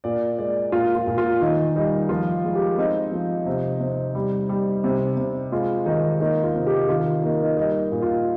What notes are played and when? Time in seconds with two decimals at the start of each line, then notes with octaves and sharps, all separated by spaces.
0.04 A#2 D5
0.39 G#3 D5
0.72 A#2 F4
0.95 F4
1.07 A#2
1.18 F4
1.41 D#3 D#4
1.76 G3 D#4
2.09 F3 F4
2.45 G#3
2.55 G4
2.78 C4 D#4
3.12 F3
3.46 C3
3.80 C3
4.15 G3
4.49 G3
4.84 C3
5.17 C3
5.52 G#3 F4
5.86 D#3 D#4
6.20 A#3 D#4
6.44 F4
6.55 C3
6.67 G4
6.89 D#3 F4
7.23 A#3 D#4
7.43 D#4
7.57 G3 D#4
7.92 A#2
8.02 F4